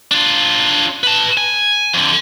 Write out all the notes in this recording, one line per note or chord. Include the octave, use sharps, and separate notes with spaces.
D4 F4
B4 A5
G#5
F2 D3